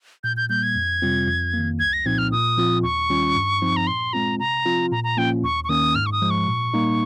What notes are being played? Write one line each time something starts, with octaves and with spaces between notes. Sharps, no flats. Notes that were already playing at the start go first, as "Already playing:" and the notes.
A#2 G6
G6
G3 A#3 G6
G#6
F2
C3 G3 C4 F4
F2
D#3 A#3
C2 G#6
A#6
A#2 F3 C4 D#4 G#6
F6
A#2 D#6
F3 C4 F4
D#2 C#6
D#3 G3 C#4 F4
G2
F3 C4 D#4
A#5
A#2 C6
G#3 C4 F4 A#5
C3 A#5
F3 C4 F4
A#2 A#5
A#5
F3 A#3 C#4 F4 G5
D#2 C#6
C#6
D#3 A#3 C#4 D#6
G#2 F6
C#6
D#6
F3 G#3
C#6
A#2
G3 A#3 D#4